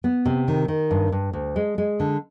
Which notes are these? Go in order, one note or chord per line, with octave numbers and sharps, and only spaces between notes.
B3
C3
D#3
D#3
G2
G2
D2
G#3
G#3
D3